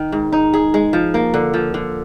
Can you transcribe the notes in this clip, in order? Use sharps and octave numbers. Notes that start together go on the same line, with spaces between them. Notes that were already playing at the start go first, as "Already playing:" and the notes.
Already playing: D#3
G#2
D#4
G#4
G#3
F3
A#3
D3
F3
D3